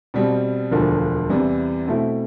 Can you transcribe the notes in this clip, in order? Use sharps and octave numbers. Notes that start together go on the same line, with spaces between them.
B2 G3 C4
E1 D2 D3 F3
E2 C3 E3 G3
B2 A3 C4 E4 A4